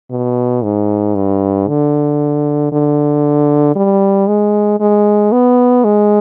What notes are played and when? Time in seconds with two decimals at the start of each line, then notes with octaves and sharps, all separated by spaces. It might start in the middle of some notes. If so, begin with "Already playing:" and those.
0.10 B2
0.63 G#2
1.15 G2
1.68 D3
2.72 D3
3.75 G3
4.27 G#3
4.80 G#3
5.32 B3
5.84 G#3